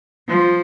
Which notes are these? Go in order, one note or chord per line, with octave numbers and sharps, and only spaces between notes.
F3